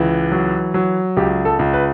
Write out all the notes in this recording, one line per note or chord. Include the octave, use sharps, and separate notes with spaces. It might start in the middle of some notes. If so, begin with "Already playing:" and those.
Already playing: C#2 E3
F#3
F#3
C#2 G4
A4
C#2
B4